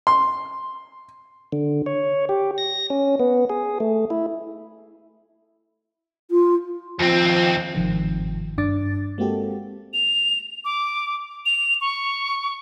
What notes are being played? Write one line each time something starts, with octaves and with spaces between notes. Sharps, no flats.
C6
D3
C#5
G4
A#6
C#4
B3
G#4
A3
E4
F4
D#2 F3 C4
G1 G#2 C3 D#3 F3
G2 D4 D6 A6
G#3 A#3 C4 F#4 G4 A4
F7
D6
F7
C#6